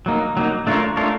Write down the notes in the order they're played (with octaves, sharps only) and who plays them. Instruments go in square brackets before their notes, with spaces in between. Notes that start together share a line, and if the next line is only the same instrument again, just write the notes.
[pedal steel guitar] F#3 A#3 D#4
F#3 A#3 D#4
A3 D4 F4 A#4 C#5
A3 D4 F4 A#4 C#5